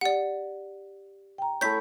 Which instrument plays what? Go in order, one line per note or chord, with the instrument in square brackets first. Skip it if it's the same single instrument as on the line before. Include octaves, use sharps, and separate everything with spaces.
[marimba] G4 [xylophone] D5 F#5
[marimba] G5 A#5
[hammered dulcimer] A3 E4 C#5 [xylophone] G6 B6